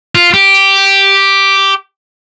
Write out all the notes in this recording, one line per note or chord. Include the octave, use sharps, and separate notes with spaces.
F4
G4